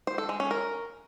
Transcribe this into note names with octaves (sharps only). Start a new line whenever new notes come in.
C5
A4
G#3
C#4
A#4